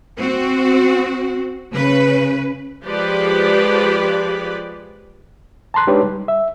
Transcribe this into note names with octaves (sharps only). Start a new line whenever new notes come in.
C4 F#4
C#3 B4
F3 G#3 G4 B4 D5
A5 A#5 C6 F#6
G#3 D4 D#4 G4 B4 C#5
G3
E5